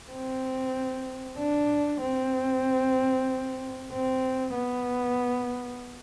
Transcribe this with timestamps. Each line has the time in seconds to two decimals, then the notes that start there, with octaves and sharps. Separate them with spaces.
0.12 C4
1.38 D4
2.01 C4
3.92 C4
4.55 B3